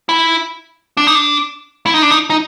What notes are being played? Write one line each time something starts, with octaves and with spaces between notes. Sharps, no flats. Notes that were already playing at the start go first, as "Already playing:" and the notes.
E4
D4
D#4
D4
E4
D#4
D4
D#4
D#4